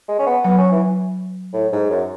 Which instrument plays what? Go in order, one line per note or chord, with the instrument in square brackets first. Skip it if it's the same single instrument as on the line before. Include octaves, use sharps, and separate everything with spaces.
[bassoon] G#3
C#4
B3
[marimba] F#3 [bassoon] B3
[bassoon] C#4
E3
A2
G#2
F#2